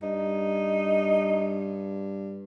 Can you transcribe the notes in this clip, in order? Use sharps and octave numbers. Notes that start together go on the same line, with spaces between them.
G2 D#4